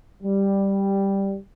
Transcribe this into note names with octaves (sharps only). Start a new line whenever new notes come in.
G3